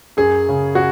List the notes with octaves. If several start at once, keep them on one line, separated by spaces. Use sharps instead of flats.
F#2 G#4
C#3
F#4